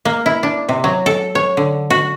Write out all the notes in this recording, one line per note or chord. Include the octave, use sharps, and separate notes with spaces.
A#3
E4
D4
C3
F#3
A4
C#5
D3
F#4